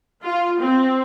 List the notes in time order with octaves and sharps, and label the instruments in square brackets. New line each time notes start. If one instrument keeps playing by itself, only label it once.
[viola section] F4
C4